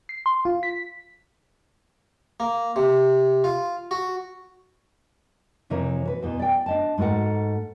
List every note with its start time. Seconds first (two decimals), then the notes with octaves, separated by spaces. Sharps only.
0.09 C7
0.26 C6
0.45 F4
0.63 B6
2.40 A#3
2.76 C3
3.44 F4
3.91 F#4
5.70 F2 C3 E3 A#4 C#5
6.05 F#4 B4
6.23 E2 B2 E3
6.39 D5 G5
6.66 D4 D#5 A5
6.98 G#2 A3 F#4 A#4 F#5